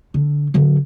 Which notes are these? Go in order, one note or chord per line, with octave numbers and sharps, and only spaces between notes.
D3
D3 F#3